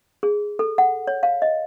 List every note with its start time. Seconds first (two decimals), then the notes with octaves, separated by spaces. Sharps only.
0.23 G#4
0.59 A4
0.78 F#5
1.07 C#5
1.23 F5
1.42 D#5